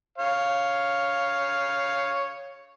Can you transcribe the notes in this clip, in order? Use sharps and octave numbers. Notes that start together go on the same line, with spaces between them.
C#5 F5